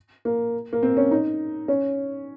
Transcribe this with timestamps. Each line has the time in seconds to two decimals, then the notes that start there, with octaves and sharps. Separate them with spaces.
0.25 A#3
0.73 A#3
0.83 C4
0.97 C#4
1.11 D#4
1.68 C#4